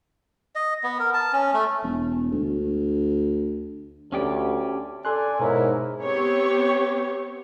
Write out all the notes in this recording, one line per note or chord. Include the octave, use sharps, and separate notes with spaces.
D#5
B3
A#4
A5
C#4
A3
E1
D2
D2 C#4 G4 D5
A4 D5 G#5 C6 F#6
G#2 B2 D#4 E4 A#4 C#5
B3 C4 G4 C#5